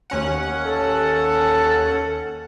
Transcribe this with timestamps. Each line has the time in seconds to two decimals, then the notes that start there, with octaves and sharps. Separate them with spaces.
0.10 D#2 C#4 F#5
0.64 A4